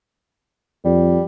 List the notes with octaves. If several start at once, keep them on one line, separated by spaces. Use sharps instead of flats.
F2 G3